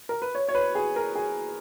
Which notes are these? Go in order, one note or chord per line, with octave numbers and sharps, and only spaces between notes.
A#4
B4
C#5
C#5
B4
G#4
A#4
G#4